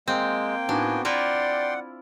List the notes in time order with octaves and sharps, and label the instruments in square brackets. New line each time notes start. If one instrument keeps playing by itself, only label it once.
[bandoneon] G#3 [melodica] A#3 G5 [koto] C4
[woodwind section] A2 D#4 G#5 [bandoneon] B3 F#4 [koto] D4
[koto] E4 F4 A#5 [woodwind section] D5 [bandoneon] F#5 [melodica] G5 C6